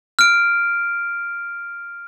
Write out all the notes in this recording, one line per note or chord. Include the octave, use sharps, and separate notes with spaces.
F6 D7